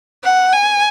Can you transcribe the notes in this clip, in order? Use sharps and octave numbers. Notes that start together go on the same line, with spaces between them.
F#5
G#5